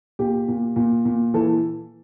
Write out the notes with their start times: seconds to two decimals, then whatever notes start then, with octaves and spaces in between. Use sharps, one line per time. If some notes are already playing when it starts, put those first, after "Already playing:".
0.19 A#2 G4
0.48 A#2
0.76 A#2
1.05 A#2
1.34 E3 A4